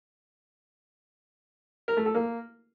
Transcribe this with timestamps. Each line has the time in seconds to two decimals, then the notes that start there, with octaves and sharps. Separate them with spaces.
1.88 A#4
1.97 A3
2.06 A4
2.15 A#3